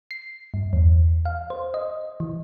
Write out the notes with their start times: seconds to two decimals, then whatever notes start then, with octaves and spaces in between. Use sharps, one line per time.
0.11 C7
0.54 G2
0.73 E2
1.25 F5
1.50 C5
1.74 D#5
2.20 E3